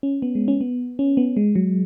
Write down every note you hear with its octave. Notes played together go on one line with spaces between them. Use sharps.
C#4
B3
G#3
C#4
B3
C#4
B3
G#3
F#3